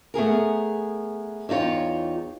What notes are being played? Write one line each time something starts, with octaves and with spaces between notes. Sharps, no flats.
A3 B3 G#4 A#4
E2 D#4 F4 C#5 G5